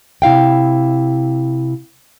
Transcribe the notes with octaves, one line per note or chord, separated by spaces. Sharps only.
C3 E4 F5 G5